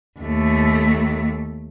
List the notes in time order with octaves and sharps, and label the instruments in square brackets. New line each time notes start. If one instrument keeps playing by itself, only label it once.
[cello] D#2 A3